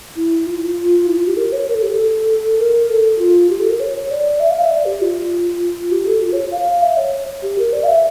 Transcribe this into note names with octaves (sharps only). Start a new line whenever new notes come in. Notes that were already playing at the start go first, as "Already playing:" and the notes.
E4
F4
E4
F4
G4
A#4
C#5
A#4
A4
G4
A4
A#4
A4
F4
G4
A4
A#4
C#5
C#5
D5
E5
F5
E5
D5
G4
F4
G4
A4
F4
C#5
F5
E5
C#5
G4
A#4
D5
F5
E5